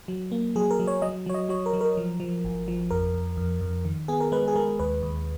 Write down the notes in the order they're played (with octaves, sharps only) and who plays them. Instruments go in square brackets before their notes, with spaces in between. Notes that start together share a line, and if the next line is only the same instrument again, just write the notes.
[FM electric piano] F#3
A#3
F#3 G#4
A#4
F#3
C#5
F#3 D#5
F#3 C#5
D#5
F#3 C#5
A#4
F#3
A#4
F3
F3
G#1
F3
F2 A#4
F2
F2
F2
D#3
B3 G#4
A#4
G#3 B4
G#4
G#3 A#4
D#2 B4
D#2